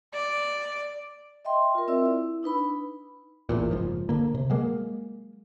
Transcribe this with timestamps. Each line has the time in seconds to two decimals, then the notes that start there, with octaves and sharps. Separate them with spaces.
0.13 D5
1.45 D#5 E5 G5 C6
1.75 F4 A#4
1.88 C4 D5 E5 E6
2.02 E4 E6
2.43 D4 D#4 B4 B5
3.49 A1 E2 A#2
3.71 F#1 G#2 F3
4.09 D3 A#3
4.35 C3
4.50 F#3 G#3 A#3